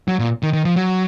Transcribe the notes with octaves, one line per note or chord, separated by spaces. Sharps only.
F#3
A#2
D#3
D#3
F3
F#3